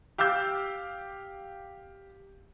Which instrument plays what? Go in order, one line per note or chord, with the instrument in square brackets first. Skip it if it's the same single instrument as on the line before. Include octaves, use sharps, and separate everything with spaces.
[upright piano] G4 F5 D6 E6 G6